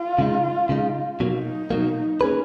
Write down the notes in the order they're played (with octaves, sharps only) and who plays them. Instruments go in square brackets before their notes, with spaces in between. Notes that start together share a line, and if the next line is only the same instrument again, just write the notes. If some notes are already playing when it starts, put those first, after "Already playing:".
Already playing: [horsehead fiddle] F4
[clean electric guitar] C#3 G#3 D#4
C#3 G#3 D#4
[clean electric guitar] B2 F#3 A#3 [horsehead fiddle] D#4
[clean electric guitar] B2 F#3 A#3
A#3 C#4 G#4 B4